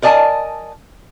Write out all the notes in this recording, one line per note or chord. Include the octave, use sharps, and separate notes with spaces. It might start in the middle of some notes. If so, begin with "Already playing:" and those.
A#4 D5 D#5 G#5 A5